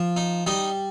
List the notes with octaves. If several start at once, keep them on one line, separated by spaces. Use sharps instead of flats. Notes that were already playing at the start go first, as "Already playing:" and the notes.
Already playing: F3
D#4
G3 D#4 D#5